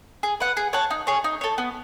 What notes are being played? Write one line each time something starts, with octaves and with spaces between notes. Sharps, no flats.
G#4
B4 F#5
G#4
C#5 F#5 A5
D#4
G#4 C#5
D#4
A4 C#5
B3